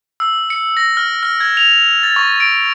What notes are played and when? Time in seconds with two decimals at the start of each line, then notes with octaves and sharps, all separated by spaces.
0.20 E6
0.50 C#7
0.77 A#6
0.97 F6
1.23 F6
1.40 G#6
1.57 F7
2.03 A6
2.16 C#6
2.40 D7